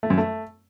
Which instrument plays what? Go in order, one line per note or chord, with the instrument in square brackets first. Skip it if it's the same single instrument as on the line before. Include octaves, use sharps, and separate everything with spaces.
[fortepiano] A3
F#2
A3